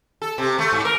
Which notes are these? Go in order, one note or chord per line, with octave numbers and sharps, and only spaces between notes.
A4
C3
A3
G#2
A#4